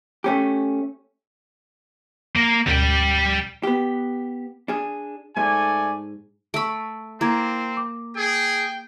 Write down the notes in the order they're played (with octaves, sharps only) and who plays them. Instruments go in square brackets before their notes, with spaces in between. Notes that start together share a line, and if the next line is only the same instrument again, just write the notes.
[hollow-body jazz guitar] A3 C#4 G4
[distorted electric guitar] A#3
[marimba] D2 G#2 B2 [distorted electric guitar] G3 G5
[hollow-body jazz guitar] B3 G4
D4 G#4
[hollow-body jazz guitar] G#2 [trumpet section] A3 D5 G#5
[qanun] A3 B5 [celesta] C#6 E6 D7
[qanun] A#3 [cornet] C4 [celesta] E4 A#5 G#6
[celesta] D6
[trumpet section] G#4 [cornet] G5